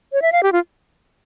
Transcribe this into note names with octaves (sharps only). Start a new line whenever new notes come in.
C#5
E5
F5
G4
F4